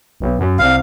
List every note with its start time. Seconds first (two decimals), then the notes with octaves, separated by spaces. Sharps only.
0.20 B1
0.39 F#2
0.59 C2 F5